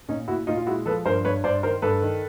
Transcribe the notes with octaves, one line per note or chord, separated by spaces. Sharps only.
A#2 C#4 D#4
A#2 E4 F#4
A#2 D#4 F4
F4
G#3 E4 F#4
F3 A4 B4
G2 A#4 C5
G2 B4 C#5
G2 C5 D5
D#3 A#4 C5
G2 A4 B4
D#3